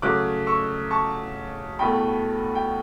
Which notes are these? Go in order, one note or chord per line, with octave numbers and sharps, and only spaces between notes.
C#3 F#3 A3 D6 F#6
C#6 E6
A5 C#6
E2 B2 A3 G5 B5
G5